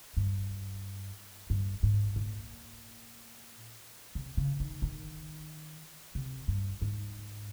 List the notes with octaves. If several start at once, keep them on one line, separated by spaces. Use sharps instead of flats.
G2
G2
G#2
A#2
C3
C#3
D#3
D#3
C3
G2
G#2